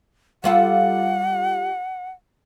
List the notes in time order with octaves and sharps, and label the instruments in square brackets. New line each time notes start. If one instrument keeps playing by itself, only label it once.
[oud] G3 F4 A4 [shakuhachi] F#5